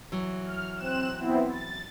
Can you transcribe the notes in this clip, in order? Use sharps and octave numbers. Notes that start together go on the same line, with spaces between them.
E3 F#3
F6
C4 F#6 E7
B3 C4 E4
A6